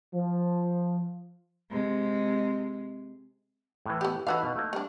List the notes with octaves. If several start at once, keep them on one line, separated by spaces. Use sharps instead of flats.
F3
C3 G#3
A2 E3
B3 G4
E3 D#4 F#4 A4 B4 F5
B2
A3 A#3
G3 D4